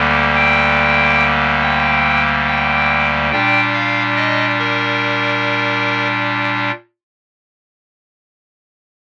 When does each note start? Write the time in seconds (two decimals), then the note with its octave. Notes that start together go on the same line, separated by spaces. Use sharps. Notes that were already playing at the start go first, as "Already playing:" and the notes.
Already playing: D2 D3 G3 A#3
0.34 G5
1.62 G5
2.47 G5
3.31 A#2 G3 D4 G5
3.74 F5
4.16 D#5
4.59 A#4